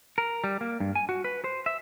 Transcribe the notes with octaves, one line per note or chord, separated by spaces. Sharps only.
A#4
G3
A#3
G2
G#5
F#4
B4
C5
E5